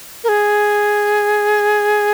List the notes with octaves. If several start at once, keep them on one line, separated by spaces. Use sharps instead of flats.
A#4
G#4